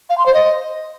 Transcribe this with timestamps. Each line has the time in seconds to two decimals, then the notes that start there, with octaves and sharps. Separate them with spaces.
0.10 F5
0.18 C6
0.26 C5
0.34 D#5